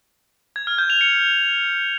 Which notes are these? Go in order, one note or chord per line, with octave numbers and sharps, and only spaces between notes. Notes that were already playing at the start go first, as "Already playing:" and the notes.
G#6
F6
G6
F7
C#7